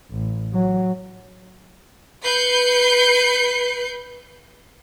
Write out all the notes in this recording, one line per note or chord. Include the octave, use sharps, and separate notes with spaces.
A1
F#3
B4 G6 C7 C#7